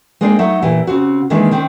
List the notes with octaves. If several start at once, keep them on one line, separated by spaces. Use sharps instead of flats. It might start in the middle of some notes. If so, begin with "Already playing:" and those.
G#3 A#3 C4 D4 D#4
F#3 A3 D#4 F#5
A#2 E3 G4
C#3 C4 F#4
D#3 E3 G#3 A#3 D4 D#4
D#3 C4 C#4